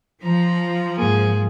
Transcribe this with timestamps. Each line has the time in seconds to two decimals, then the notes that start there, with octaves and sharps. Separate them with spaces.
0.24 F3 A#5
0.98 G#2 A#3 G#4